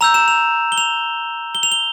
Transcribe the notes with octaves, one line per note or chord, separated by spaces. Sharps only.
A#5 E6 G6 F7
E7
F7
G7
F7
G7
F7
G7